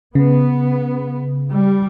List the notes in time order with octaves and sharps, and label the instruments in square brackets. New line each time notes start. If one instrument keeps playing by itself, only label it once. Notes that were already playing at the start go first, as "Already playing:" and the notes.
[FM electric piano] C#3 [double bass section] B3
[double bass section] G3